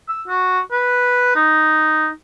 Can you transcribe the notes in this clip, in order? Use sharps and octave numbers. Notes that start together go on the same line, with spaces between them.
E6
F#4
B4
D#4